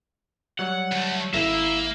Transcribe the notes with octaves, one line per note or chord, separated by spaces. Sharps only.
F#3 G3 C#5 F#5
D2 A3
G#1 A#3 E4 E5